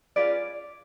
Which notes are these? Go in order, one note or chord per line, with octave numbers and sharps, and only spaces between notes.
C#4 F4 G#4 B4 D5